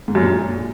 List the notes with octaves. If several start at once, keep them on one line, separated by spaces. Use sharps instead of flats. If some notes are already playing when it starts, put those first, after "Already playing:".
G#2
F#2
A#2